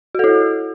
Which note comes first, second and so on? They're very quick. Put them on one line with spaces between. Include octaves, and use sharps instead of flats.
F#4 A4 E4